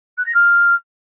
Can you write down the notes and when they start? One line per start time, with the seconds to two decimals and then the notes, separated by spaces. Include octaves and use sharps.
0.18 F#6
0.26 A#6
0.34 F6